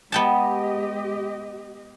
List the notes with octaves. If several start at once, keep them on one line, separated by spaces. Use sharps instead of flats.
G#3 B3 G4 D#5 G5 A5